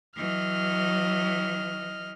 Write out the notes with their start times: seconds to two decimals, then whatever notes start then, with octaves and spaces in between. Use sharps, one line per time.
0.17 E3 F#3 D#5 F6